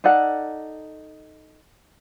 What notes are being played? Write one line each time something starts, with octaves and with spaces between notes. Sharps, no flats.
D#4 A4 D5 F#5